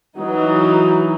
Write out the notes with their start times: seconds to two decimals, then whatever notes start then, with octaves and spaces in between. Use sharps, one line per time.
0.19 E3 F#3 D#4